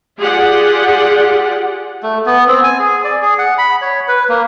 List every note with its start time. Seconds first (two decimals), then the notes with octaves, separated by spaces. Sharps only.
0.18 F4 G4 G#4 D5 F#5
2.03 A3
2.26 B3
2.47 C4
2.64 G#5
2.79 G#4
3.04 D5
3.22 G#4
3.39 F#5
3.58 B5
3.82 C#5
4.08 B4
4.29 A#3